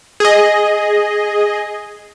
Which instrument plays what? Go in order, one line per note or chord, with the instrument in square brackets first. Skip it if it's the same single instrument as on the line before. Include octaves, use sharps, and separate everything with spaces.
[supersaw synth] G#4 D#5